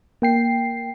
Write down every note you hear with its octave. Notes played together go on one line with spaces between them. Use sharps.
A#3 G5 C7